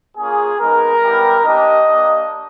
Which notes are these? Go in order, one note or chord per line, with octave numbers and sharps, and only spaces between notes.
A#3 C#4 F4 G#4
G#3 B3 D#4 A#4
G3 B3 E4 G4
A#3 D4 G4 D#5
A#3 D4 G4